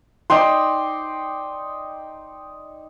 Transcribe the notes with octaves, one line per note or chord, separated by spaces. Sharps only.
D#4 D5 G5 C6